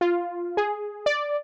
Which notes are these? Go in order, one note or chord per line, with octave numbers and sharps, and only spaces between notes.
F4
G#4
D5